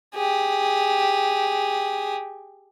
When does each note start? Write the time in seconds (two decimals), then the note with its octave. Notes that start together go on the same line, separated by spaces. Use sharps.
0.16 G4 G#4